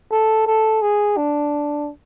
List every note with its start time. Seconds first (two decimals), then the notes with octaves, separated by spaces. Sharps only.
0.12 A4
0.47 A4
0.82 G#4
1.17 D4